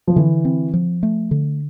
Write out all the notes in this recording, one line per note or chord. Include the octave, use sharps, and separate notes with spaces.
F3
D3 E3
C4
F3
A3
D3